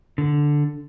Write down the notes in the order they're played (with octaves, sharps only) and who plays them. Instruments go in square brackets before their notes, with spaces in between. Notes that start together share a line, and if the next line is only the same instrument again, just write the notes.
[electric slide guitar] D3